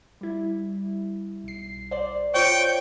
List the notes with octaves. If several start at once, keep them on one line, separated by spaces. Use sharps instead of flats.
G3 E4
B1 C7
C5 D5
F4 C5 C#5 G5 C#6